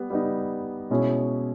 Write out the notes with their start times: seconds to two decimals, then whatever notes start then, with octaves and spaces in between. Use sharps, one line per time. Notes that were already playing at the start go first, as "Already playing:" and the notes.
Already playing: G3 B3
0.10 G3 B3 D#4
0.90 B2 G#3 C#4 E4